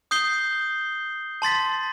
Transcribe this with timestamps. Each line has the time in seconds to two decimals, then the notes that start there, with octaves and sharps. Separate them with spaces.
0.11 D#6 G6 C7 G7
1.42 A5 C6 A6 B6